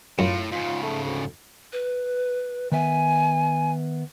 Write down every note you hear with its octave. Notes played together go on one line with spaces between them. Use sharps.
F#2 A2 F4
G#2 C#3 F4
A3
D2
B4
D#3 B3 E5 G#5